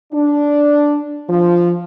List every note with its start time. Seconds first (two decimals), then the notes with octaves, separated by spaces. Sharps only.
0.12 D4
1.29 F3